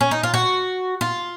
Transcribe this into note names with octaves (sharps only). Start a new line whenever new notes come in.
C#4
D#4
F4
F#4
F4